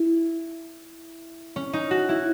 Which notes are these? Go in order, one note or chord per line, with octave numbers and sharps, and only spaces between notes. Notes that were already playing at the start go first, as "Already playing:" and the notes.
Already playing: E4
C#4
D#4
F#4
E4